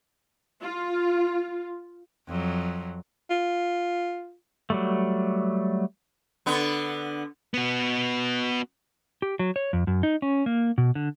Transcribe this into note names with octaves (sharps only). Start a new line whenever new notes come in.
F4
F2 F#3
F4
F#3 G3 A3
D3 B3
B3 F#4
G4
F#3
C#5
F2
F#2
D#4
C#4
A#3
B2
D3